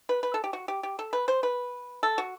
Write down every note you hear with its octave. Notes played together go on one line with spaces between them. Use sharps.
B4
B4
A4
G4
F#4
G4
G4
A4
B4
C5
B4
A4
F#4